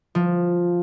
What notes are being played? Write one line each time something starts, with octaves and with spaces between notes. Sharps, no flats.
F3